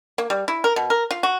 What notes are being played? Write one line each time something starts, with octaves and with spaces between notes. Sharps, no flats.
A#3
G3
E4
A#4
B2
A#4
F4
F#4